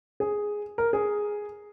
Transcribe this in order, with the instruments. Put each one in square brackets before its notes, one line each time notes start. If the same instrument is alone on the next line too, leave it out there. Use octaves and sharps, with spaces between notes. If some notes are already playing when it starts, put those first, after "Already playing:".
[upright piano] G#4
A#4
G#4